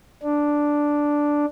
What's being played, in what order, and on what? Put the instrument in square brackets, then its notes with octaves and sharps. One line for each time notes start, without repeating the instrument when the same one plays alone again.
[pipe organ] D4